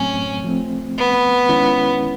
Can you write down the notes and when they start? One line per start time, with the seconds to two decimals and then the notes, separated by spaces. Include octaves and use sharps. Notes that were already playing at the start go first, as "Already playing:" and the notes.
Already playing: A2 F#3 A3 C4 C#4
0.44 F3 A3 C4
0.97 B3
1.49 D#3 G#3 C#4 E4